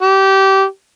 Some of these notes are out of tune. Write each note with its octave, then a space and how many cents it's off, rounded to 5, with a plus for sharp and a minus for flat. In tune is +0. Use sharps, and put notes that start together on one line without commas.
G4 -20